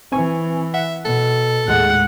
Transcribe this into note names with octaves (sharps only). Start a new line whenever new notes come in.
E3 C4 G#5 C#6
E5 F#5
B2 A4
D#2 A2 G#3 F#5